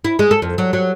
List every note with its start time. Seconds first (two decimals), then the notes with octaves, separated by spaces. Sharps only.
0.05 E4
0.19 G#3
0.31 A4
0.42 F2
0.58 F#3
0.73 F#3